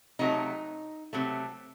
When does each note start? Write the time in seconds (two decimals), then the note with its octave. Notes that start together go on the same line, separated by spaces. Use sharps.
0.19 C3 F#3 A3 D#4
1.13 C3 F#3 A3